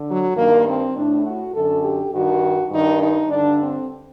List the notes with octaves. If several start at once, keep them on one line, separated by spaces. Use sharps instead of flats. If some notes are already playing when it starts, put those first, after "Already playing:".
Already playing: D3
F#3
G2 D#3 A#3
C4
A2 D4
F#4
F#2 D3 A4
G4
G2 D#3 F#4
G2 D#3 D#4
D#4
G2 D3 D4
C4